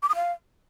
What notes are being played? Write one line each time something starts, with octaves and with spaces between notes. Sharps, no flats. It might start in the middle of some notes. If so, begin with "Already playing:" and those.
D6
D#6
F5